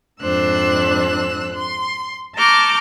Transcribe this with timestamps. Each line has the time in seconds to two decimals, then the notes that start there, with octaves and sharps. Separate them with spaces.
0.22 F2 G#2 D4 C5 E6 F#6
1.54 C6
2.36 A5 A#5 C#6 D6 F6 G6